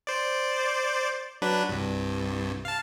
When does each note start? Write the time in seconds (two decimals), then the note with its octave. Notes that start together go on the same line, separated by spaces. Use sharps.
0.07 C5 D5
1.42 F#3 D4 B4
1.69 C2 G2
2.65 F5 A5